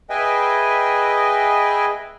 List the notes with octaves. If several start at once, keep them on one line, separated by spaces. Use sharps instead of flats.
G#4 B4 D#5 E5 G5 G#5